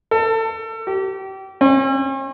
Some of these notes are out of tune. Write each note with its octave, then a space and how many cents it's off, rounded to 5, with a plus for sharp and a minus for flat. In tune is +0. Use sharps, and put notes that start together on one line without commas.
A4 +30
G4 -30
C#4 -45